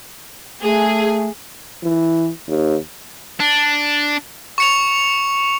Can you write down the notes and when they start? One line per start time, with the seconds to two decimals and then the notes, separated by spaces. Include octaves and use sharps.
0.62 A3 G#4
1.83 E3
2.48 D#2
3.40 D4
4.58 C#6 C#7 F7